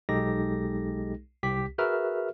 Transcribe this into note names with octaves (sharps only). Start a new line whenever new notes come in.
B1 G#3 D#4 G4 A4 A#6
C2 G4 B6
F#4 G#4 A#4 B4 E5 F6